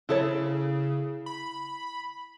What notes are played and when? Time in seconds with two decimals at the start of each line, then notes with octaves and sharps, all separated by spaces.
0.09 C#3 E4 A4 C#5
1.26 B5